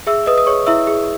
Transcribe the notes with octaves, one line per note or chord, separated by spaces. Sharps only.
G#4 E5 E6
B4 D#5 D#6
D#6
G#4 C#5 C#6
E4 E5 E6
G#4